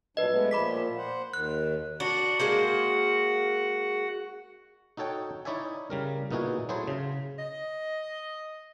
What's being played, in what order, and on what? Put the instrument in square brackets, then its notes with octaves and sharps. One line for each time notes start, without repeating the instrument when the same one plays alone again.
[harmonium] A#2 F#3 D4 [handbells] B4 D#5
[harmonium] G#3 A3 B3
[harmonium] A#2 F3 [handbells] B5 D6 B6
[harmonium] C5 F#5
[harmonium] D#2 D#3 [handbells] F#6
[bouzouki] D4 [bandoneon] F#4 F#5
[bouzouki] G#3 A#3 C5
[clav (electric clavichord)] D#4 F#4 A4 C#5 G5
D#4 E4 C#5 D5 E5 G#5
C#3 G3 A#4
A#2 B3 D#4 E4 F#4 G#4
F#3 E4 G#4 A4 C5
C#3
[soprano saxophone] D#5